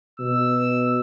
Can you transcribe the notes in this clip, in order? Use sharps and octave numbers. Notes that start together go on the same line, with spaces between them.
B2 E6